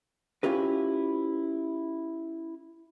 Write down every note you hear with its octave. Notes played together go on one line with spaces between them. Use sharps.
C#4 E4 F4 G4 B4